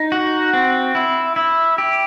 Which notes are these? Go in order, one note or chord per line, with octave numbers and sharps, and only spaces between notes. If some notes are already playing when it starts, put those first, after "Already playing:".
Already playing: D#4
F#4
C4
E4
E4
G4